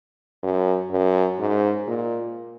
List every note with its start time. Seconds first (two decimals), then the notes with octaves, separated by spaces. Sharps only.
0.43 F#2
0.91 F#2
1.39 G#2
1.88 A#2